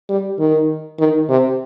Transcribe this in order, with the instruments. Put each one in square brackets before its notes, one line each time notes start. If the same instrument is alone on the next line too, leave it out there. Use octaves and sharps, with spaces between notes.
[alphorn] G3
D#3
D#3
C3